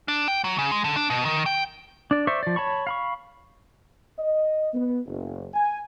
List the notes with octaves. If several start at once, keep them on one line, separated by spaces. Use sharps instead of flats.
D4
G5
F#3
C#3
G#3
D3
D4
B2
D#3
G5
D4 D5
C5 D5 E5 C#6
F3 D5
C#5 A5 B5 C#6
F5 B5 C#6
D#5
B3
F#1
G#5